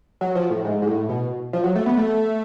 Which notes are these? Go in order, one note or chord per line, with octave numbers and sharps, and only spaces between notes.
F#3
F3
A2
G#2
G#2
A2
B2
F3
F#3
A3
B3
A3